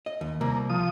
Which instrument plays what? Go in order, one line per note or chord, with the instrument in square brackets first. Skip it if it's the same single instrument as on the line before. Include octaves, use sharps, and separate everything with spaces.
[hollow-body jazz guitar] D#5
D#2
[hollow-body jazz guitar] C2 [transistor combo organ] A#3
[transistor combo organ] F3 D#6